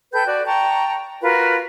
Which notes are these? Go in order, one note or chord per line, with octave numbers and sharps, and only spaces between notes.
A4 B4 G5 G6
F#4 D5
G5 A5 A#5 C#6
F4 F#4 A#4 B4